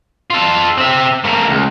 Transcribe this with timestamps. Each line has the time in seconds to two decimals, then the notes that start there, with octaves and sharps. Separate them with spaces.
0.30 F4 A4
0.78 C4 E5
1.24 A3 A#3
1.48 C#2